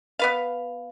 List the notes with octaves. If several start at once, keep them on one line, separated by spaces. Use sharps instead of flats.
B3 B4 F5